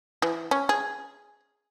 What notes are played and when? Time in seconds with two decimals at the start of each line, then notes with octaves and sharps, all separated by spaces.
0.22 E3
0.51 C#4
0.69 G#4